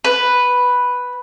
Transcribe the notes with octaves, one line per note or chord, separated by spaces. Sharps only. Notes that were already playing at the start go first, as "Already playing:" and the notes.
B4